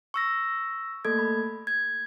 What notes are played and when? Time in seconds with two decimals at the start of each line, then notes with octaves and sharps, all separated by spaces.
0.14 C#6 E6 A#6
1.05 A3 A#3 A4 G#6
1.19 B5
1.67 G#6